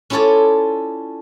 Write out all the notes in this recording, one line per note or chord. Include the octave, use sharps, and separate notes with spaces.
C#4 E4 F4 A4 C#5 D5